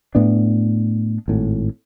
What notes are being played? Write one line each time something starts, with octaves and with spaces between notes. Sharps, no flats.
A2 B3 D4
G#1 A2